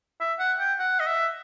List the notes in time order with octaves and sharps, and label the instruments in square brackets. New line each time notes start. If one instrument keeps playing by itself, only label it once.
[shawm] E5
F#5
G5
F#5
D#5
E5